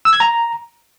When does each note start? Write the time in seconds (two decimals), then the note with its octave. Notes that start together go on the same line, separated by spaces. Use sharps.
0.05 E6
0.13 G#6
0.20 A#5